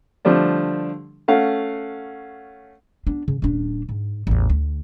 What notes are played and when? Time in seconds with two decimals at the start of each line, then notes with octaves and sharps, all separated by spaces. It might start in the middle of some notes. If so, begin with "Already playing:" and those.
0.25 D3 F3 G3 A3 D4
1.28 A3 C#4 F5 F#5
3.07 B3 D4
3.28 C#3
3.42 D#1 D4
3.89 G#2
4.27 A1 E2
4.50 D2